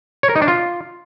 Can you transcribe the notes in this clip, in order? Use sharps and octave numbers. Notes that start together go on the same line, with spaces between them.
C#5
A#4
D#4
D4
F4